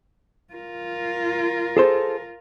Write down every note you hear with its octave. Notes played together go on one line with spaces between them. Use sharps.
F4 A#4
G#4 A4 C5